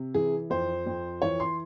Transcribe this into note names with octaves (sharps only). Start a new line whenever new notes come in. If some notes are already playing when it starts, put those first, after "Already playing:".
Already playing: C3
E3 G#4
F2 C5
F2
E3 C#5
C6